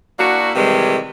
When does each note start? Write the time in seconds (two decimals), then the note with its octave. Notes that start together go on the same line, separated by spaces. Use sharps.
0.20 A#3 D4 E4 F#4
0.55 C3 D#3 E3 G3 G#3